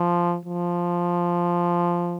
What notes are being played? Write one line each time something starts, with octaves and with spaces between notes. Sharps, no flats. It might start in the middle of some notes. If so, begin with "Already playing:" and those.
Already playing: F3
F3